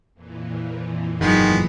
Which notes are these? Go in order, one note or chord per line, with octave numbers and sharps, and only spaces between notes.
F2 A#2 E3
G1 D#3 F#3 G#3 B3